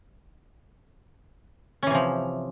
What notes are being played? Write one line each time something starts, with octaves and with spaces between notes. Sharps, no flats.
C3 E3 F3 C#4